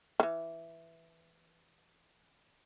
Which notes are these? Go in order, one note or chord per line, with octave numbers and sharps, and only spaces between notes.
D#3 E3